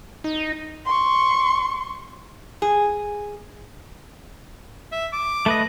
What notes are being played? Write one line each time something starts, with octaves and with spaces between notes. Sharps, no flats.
D#4
C6 C#6
G#4
E5
D6
A3 B4 D#5